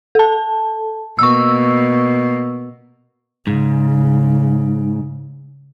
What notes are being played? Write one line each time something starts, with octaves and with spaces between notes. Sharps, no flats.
A4 A5
B2 A#3 C#6 E6
G#2 C#3